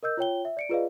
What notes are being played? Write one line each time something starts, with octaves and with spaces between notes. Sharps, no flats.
A#4 D#5 E6 G6
F4 C#5 G5 G7
E5
D5 C#7 D7
F4 G#4 B4 D5 D#5 F5